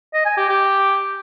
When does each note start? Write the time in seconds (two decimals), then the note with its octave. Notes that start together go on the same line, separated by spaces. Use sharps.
0.14 D#5
0.26 G#5
0.38 G4
0.49 G4